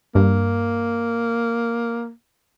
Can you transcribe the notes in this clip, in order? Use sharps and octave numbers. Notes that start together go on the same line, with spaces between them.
G2 A#3